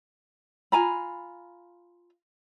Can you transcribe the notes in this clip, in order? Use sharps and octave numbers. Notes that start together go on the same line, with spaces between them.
F4 G#5 A#5 B5